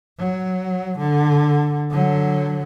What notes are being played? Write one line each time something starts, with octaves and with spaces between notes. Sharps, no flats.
F#3
D3
D3 F#3